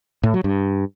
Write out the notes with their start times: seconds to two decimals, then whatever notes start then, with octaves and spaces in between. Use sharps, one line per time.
0.23 A2
0.34 F#3
0.44 G2